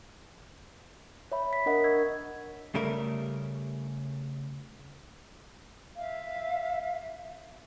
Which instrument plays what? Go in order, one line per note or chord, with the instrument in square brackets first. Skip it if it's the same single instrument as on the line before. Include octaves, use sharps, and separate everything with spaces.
[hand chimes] C#5 E5 B5
B6
D4 A#4 D#5 F#5
C#6 E6 G#6
[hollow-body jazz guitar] C#3 G3 A3 A#4
[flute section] E5 F5